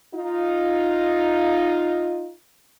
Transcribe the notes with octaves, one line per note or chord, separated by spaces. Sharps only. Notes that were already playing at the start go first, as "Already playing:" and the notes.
D#4 F4